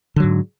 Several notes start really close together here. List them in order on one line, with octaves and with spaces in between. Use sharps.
D3 F#3 G#2